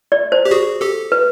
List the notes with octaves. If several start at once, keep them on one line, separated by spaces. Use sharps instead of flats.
D5
C5
G4
F#4 G#4
G4 A4
B4